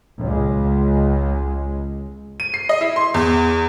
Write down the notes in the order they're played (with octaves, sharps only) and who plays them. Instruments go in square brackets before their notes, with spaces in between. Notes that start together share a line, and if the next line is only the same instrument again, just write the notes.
[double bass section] C#2 G#3
[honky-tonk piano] D#7
C7
D#5
E4
C6
E2